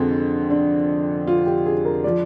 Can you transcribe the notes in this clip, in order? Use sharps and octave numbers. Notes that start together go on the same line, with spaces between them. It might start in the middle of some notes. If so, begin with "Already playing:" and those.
Already playing: F2 D3 G#3 C4
D4
F4
G4
G#4
A#4
F3 D5